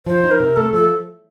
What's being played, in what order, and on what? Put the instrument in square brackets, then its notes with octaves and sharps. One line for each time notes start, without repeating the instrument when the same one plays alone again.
[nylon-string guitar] F3 [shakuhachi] C5
[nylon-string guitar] D#4
[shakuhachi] A#4
[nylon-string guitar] C3
[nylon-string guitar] A3 [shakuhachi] A4
[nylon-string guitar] F3 [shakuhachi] A4